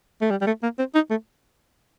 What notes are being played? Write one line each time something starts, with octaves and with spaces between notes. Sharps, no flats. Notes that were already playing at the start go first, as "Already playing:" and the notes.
A3
G3
G3
A3
A#3
C4
D#4
A3